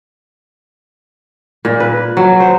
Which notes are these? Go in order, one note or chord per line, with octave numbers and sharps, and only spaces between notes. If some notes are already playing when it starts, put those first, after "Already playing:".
A#2
B4
F#3
C5